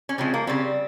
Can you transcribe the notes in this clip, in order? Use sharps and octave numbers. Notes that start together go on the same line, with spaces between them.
C#4
C#3 F3 G#3 C4
A#3
C#3 G3 C4